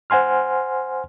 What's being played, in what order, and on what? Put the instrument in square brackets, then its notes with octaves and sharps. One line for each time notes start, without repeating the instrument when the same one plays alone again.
[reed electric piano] C5 F#5 G#5 C6 F6